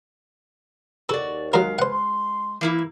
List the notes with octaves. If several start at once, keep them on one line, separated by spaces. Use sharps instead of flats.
D#2 F#4 A4 D5
F#3 G#3 A#4 F5
B4 C5 F#5
C6
E3 A#3 E4